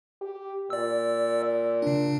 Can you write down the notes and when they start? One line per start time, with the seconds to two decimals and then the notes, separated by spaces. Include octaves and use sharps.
0.21 G4
0.70 A#2 D5 E6
1.82 C#3 D4